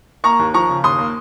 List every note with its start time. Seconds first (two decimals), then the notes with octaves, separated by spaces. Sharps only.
0.24 A#3 A#5 C#6
0.39 D#2
0.54 F3 A#5 C#6
0.69 C#3
0.84 D#2 C6 D#6
0.99 A#3